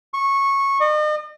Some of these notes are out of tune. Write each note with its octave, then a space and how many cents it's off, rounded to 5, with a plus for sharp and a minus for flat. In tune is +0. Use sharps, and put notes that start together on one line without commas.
C#6 -10
D#5 -40